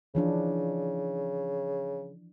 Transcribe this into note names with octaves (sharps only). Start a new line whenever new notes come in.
C#3 E3 F3 D4